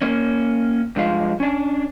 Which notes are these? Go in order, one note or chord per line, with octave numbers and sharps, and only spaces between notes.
A#3 C#4
G2 F3 G#3 F5
C#4 D4